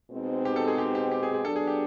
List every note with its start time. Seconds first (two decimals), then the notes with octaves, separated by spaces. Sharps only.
0.11 B2 G#3 C4 D#4
0.45 G4
0.56 A4
0.68 G#4
0.78 G4
0.95 G4
1.11 G4
1.23 G#4
1.34 G#4
1.45 F#3 B3 D4 A4
1.56 G#4
1.67 G4